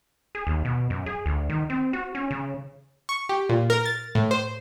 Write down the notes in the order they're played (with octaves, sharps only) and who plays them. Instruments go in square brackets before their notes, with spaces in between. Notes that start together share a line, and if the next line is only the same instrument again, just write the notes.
[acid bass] G#4
D#2
B2
F#2
G#4
D2
D#3
C4
F#4
C#4
C#3
[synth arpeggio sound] C#6
G4
A#2
A#4
A6
A2
C5